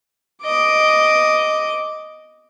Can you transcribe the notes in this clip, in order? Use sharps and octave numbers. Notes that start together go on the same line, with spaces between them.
D#5 D6